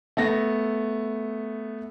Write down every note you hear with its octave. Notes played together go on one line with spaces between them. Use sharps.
A3 B3 A#6